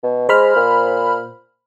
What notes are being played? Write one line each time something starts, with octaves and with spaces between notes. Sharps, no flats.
B2
G#3 C5 B5 F6
A#2